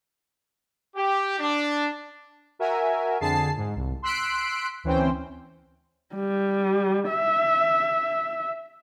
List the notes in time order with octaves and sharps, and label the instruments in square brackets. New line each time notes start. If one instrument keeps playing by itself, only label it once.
[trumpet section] G4
D4
[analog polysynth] F#4 A#4 E5 G#5
F2 D3 G#4 A5 C7
G#2
C2
C6 E6 F#6 B6 C7 D7
D2 E3 C4 C#4 C5 G5
[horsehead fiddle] G3
E5